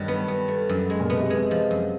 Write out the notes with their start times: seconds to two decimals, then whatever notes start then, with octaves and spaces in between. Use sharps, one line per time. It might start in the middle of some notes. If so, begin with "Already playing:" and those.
Already playing: G2 D#3 F#3
0.08 B3
0.28 B3
0.48 A3
0.69 F#2
0.90 G#3
1.00 A#2
1.10 B2 B3
1.20 C3
1.30 G#3
1.51 F3
1.71 F#2